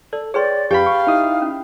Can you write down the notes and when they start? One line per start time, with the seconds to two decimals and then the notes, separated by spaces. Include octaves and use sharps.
0.13 A4 D5
0.34 G#4 B4 C#5 D5 G5 C6
0.71 F2 G4 B4 F5 G5 B5
0.86 C#6
1.07 D#4 E4 D#6
1.42 C#4